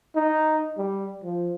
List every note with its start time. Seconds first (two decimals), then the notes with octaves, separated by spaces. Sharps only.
0.16 D#4
0.78 G3
1.24 F3